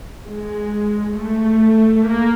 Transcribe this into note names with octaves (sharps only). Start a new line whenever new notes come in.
G#3
A3
A#3